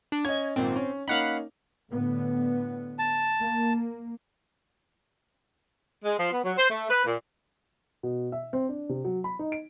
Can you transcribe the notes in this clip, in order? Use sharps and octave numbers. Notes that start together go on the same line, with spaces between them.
D4
C#4 D#5 G#6
G#1 A#2 C4
C#4
A#3 C#4 D#4 F5 F#5 B5
A2 D3 B3
A5
A#3
G#3
F3
B3
F#3
C5
A3
B4
A#2
B2
E5
C4
D4
C3
F#3
B5
D#4
D7